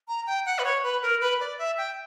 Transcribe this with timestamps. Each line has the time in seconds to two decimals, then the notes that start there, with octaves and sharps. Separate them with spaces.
0.08 A#5
0.27 G5
0.46 F#5
0.59 B4
0.65 C#5
0.84 B4
1.02 A#4
1.21 B4
1.40 D5
1.58 E5
1.78 G5